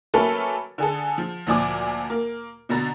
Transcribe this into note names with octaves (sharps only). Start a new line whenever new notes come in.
F#3 A3 A#3 C#4 A4 B4
D3 G#4 A4
F3
D2 A#2 F3 D5 G#5 D6
A#3
B2 D3 A#5 A6